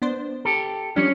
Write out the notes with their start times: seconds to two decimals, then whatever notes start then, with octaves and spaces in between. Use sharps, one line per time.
0.02 B3 D4 C5
0.45 G4 A4
0.96 F3 G3 C#4 D4 C#5